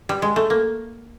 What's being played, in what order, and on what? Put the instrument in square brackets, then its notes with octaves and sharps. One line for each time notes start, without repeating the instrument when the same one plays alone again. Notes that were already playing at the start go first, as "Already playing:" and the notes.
[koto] G3
G#3
A3
A#3